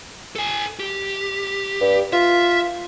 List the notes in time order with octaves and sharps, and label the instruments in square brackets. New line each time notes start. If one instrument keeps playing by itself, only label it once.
[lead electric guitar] A4 G#5
G4
[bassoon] G2
[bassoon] F4 [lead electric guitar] E5